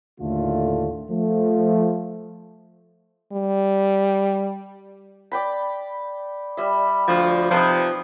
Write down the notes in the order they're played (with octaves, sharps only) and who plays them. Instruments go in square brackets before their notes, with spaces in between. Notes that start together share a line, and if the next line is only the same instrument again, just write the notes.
[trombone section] D#2 A2 D3 A3 F4
F3 A3
[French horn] G3
[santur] D5 G5 B5
G3 E5
[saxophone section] D2 F3
[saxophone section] C3 F3 [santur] D#4 B4 C5